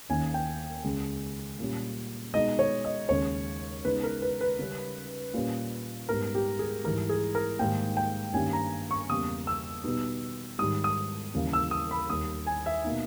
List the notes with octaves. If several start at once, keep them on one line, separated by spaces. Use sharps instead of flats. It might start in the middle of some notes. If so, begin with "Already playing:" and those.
D#2 D#3 A#3 C#4 G#5
G5
C#2 C#3 G#3
A#2 G3 C#4
B2 G#3 D#4 D#5
C#5
D#5
D#2 C#3 G#3 C#4 C#5
C#3 G#3 B3 D#4 B4
A#4
B4
B4
C#3 G3 C#4
A#2 G3 A#3 C#4
G#2 G3 B3 A#4
G4
G#4
G#2 E3 G3 A#4
G#4
A#4
G#2 D#3 G3 A#3 G5
G5
G2 D#3 G3 A#3 C#4 G#5
A#5
C#6
E2 C#3 G3 A#3 D#6
E6
B2 G3 B3 D#4
G#2 D#3 G3 D#6
D#6
D#2 C#3 E3 G3 A#3
E6
D#6
B5
D#2 D#3 G3 D#6
G#5
E5
B2 A#3 D#4